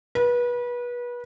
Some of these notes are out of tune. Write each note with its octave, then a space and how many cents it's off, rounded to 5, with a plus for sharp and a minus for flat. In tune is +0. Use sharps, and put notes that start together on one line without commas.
B4 -30